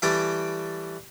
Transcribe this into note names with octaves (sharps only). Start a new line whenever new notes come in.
E3 G3 A3 G4 D5 D6